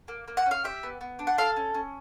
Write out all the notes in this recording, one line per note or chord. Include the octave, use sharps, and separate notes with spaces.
A#3
A#3
F#5
C#4
F5
G4 E5
B3
B3
D4
F#5
A4 F5
C#4
C#4